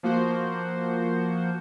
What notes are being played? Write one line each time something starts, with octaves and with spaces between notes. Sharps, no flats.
F3 A#3 F#4 C5